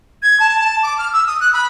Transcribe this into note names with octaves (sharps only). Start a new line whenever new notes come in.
G#6
A5
A5
D6
F6
E6
D#6
F#6
B5